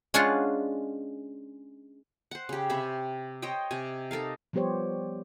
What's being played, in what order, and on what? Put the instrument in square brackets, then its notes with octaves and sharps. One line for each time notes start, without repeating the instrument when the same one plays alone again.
[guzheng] G#3 C#4 D4 F4 F5 F#5
[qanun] C5 F#5
C#3 G4
C3 C#5 E5 B5
C5 C#5 D#5 G5
C3 G#5
D#4 A4 A#4 F5
[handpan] F3 G3 B3 G4 C5 C#5